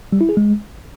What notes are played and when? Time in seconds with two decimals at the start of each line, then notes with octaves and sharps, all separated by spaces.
0.12 G3
0.21 E4
0.29 G#4
0.37 G#3